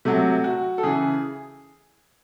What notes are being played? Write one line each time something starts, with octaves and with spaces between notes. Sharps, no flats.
C3 F#3 A3
F#4
A4
C#3 E3 G#4